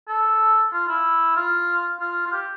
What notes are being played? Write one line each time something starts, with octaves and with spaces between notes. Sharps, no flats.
A4
F4
E4
F4
F4
F4
G4